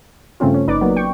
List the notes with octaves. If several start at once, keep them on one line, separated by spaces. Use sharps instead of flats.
G2 C#3 A3 C4 C#4 F4
C#4
G1 D#4 B4 D5 D6
F#3 A#3 B3
G5 C#6